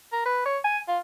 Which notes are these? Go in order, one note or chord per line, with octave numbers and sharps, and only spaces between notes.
A#4
B4
C#5
G#5
F4